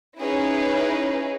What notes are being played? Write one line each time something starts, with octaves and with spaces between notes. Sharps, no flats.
C#4 D#4 E4 G#4 B4